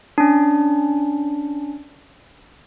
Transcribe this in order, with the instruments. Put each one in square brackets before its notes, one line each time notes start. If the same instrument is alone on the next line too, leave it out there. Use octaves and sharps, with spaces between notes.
[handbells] C#4 D4